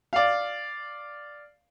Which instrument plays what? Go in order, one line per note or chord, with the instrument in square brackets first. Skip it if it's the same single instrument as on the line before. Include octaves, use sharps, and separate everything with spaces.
[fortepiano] D5 F5